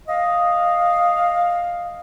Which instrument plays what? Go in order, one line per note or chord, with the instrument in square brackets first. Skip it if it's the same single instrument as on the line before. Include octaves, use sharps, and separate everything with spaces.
[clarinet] D#5 [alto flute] F5